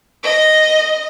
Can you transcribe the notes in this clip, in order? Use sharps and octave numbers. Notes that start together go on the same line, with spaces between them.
D#5